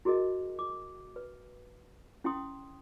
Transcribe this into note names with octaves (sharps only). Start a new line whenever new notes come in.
E4 F#4 G#4 A#4 D#5
D6
B4
C#4 E4 F#5 G5 C6 D#6